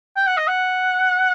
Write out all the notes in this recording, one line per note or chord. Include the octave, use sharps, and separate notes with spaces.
G5
F#5
D#5
F#5